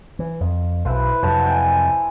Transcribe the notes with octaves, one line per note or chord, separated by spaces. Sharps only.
E3
F2
B1 E4 B4 C5
F2 C3 F#3 C5 F#5 A5
G5 G#5